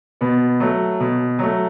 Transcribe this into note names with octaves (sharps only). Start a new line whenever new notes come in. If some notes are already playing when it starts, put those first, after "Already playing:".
B2 B3
F#3 A3
B2
F#3 A3